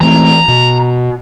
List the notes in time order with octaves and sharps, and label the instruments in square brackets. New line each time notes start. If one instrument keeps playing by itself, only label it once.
[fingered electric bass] E3 A3 C4 [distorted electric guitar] A#5
[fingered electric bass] B2